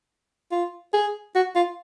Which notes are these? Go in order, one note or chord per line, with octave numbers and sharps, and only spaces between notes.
F4
G#4
F#4
F4